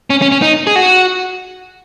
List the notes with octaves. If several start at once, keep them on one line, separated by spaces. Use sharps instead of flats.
C#4
C#4
C#4
D#4
G#4
F#4